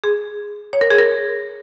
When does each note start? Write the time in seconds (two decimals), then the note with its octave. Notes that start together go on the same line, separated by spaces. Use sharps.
0.04 G#4
0.73 C#5
0.81 A#4
0.91 G#4
0.98 A#4